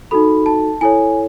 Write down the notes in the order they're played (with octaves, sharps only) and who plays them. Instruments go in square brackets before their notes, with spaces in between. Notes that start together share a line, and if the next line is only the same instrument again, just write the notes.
[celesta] D#4 F#4 A4 B5
A5
E4 A4 C#5 G#5